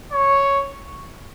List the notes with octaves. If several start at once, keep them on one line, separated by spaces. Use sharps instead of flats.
C#5